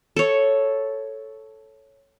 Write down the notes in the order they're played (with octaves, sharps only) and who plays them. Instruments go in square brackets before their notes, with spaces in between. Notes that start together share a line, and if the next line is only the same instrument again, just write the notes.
[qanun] A4 C#5